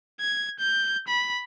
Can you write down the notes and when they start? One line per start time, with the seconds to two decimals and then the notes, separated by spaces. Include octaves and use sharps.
0.20 G#6
0.59 G6
1.08 B5